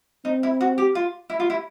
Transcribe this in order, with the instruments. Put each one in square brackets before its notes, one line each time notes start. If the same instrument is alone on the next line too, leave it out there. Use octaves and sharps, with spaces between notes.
[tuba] C4 [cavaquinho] D#4
[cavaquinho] E4
F#4
G4
F4
E4
F4
E4